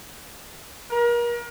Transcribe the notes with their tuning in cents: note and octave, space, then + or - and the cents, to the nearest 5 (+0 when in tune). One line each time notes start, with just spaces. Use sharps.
A#4 +35